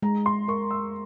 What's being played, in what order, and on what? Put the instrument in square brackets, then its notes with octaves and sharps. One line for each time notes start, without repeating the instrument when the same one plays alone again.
[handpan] G#3 [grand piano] A#5
[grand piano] C6
[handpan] A#4 [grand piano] C#6
[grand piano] E6